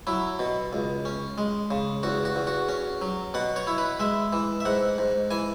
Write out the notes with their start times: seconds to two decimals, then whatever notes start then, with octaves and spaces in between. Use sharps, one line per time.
0.07 F#3 E4
0.39 B2
0.73 C#2
1.05 C#4
1.38 G#3
1.71 C#3
2.03 E2 F#4
2.25 F#4
2.36 E2
2.47 F#4
2.69 C#4
3.02 F#3
3.34 B2 F#5
3.56 C#5
3.67 E4
3.78 B4
4.00 G#3 E5
4.33 E3
4.60 E5
4.65 G#2 F#5
4.98 G#2
5.31 E3 G#5